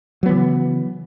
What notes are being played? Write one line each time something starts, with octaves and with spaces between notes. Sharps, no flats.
C#3 E3 F#3 B3